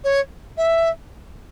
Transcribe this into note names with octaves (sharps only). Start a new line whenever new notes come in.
C#5
E5